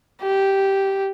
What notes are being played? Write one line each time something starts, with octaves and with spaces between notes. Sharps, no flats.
G4